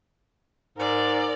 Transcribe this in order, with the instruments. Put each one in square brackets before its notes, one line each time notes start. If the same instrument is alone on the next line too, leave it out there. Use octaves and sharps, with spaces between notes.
[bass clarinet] G#2 [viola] A#4 D5